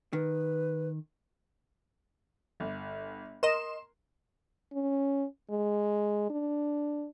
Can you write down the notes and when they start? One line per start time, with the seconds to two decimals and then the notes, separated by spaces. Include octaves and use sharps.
0.13 D#3 B4
2.60 G1
3.43 A#4 D#5 C6 E7
4.73 C#4
5.50 G#3
6.30 D4